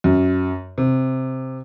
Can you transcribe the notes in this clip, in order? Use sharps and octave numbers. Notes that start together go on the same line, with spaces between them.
F#2
C3